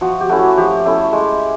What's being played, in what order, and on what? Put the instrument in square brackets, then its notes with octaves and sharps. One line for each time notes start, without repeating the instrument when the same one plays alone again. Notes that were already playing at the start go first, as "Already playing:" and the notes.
[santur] F3 F#4
G4
A3 C#4 E4 F#4
F3 G4
A3 C#4 E4
G#3